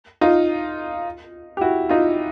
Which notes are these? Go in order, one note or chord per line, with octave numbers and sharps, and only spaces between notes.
D#4 F4
G4
E4 F#4
D#4 F4